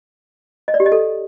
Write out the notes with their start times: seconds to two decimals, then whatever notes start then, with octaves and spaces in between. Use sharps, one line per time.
0.68 D#5
0.74 D5
0.80 G4
0.86 D#5
0.92 A4